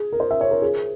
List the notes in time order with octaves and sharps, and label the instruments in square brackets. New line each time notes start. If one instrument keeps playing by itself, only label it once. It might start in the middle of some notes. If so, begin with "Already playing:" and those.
Already playing: [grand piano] G#4
A#4
C5
E5
C#5
A#4
G#4